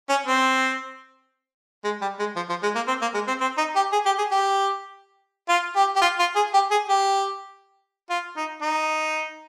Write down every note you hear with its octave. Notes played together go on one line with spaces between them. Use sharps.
C#4
C4
G#3
G3
G#3
F3
F3
G#3
A#3
C4
A#3
G#3
C4
C4
D#4
G4
G#4
G4
G#4
G4
F4
G4
G4
F4
F4
G#4
G4
G#4
G4
F4
D#4
D#4